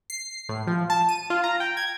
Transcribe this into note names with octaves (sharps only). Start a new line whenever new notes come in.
C7
A2
F3
A5
D#7
F4
A#5
G5
G#6